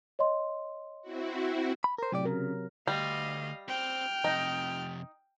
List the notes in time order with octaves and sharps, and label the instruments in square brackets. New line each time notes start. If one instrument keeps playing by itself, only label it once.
[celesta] C#5 D#5 C6
[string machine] C4 E4 F#4
[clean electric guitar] B5
A#4 C5
[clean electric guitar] A2 G4 D5 [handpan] C3 F#3
[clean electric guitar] C#3 [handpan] A#4
[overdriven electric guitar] D2 [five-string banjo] G3 [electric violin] D#5 F5
[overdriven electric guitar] C4 C5 [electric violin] G5 F6
[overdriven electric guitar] F2 C3 [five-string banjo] D#4